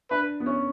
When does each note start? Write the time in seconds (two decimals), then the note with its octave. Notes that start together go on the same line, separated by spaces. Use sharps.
0.10 D4 B4
0.40 B3
0.46 C#4